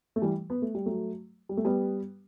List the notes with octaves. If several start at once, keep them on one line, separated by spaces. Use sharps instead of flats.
A3
E3 G3
B3
A3
G3
F#3 A3
G3
A3
G3 B3